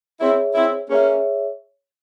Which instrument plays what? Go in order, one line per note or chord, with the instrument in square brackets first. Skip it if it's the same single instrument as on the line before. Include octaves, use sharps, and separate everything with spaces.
[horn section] C4 E4 [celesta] G#4 C#5 E5
[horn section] C4 E4
[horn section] A#3 C#4 [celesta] G#4 C#5 E5